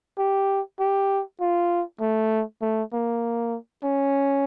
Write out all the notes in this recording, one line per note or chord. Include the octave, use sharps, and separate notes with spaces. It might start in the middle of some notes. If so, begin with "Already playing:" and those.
G4
G4
F4
A3
A3
A#3
C#4